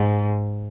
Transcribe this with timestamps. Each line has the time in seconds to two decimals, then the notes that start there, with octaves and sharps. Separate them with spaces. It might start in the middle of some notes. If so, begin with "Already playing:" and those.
Already playing: G#2